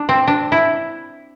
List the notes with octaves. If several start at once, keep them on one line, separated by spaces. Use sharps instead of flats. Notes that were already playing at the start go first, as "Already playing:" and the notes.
Already playing: D4
C4
D4
E4